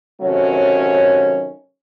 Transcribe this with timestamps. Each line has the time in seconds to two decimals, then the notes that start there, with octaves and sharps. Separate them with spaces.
0.21 C3 D#3 F#3 A3 C#4